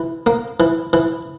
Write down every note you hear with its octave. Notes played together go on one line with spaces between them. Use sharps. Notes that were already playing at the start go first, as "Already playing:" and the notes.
Already playing: E3
A#3
E3
E3